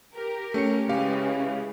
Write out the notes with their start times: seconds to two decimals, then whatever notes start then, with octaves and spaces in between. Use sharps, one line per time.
0.14 G4 A#4
0.54 A3 C#4 C#7
0.89 C#3 E3 G#3 G4 F5